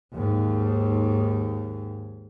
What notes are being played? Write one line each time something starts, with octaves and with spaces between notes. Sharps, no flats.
D#2 G#2